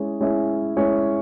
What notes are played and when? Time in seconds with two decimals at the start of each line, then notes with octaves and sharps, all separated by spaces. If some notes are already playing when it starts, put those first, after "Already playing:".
Already playing: G#3 C#4 E4 G#4 C#5
0.21 G#3 C#4 E4 G#4 C#5
0.77 G#3 C#4 E4 G#4 C#5